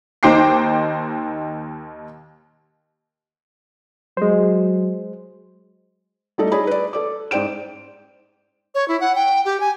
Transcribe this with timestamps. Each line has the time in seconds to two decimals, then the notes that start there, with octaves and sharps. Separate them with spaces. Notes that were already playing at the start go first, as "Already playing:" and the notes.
0.23 D#2 D#4 C5 G5 D6 C7
4.17 F#3 G#3 C5
6.38 G3 A3 D#4 A4 D5
6.52 D#4 G#4 C#5 D5 B5
6.67 B4 D5
6.93 A4 D5 D6
7.31 G#2 C5 D5 G5 D7 E7
8.75 C#5
8.88 E4
9.01 F#5
9.15 G5
9.45 G4
9.60 G#5